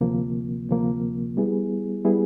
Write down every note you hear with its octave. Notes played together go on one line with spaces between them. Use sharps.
D2 C3 F3 A#3
D2 C3 F3 A#3
G3 B3 E4 G#4
G3 B3 E4 G#4